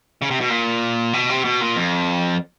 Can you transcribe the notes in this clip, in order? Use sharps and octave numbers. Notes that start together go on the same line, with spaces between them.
C#3
C3
B2
A#2
B2
C3
B2
A#2
F2